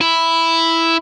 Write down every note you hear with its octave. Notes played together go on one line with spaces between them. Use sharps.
E4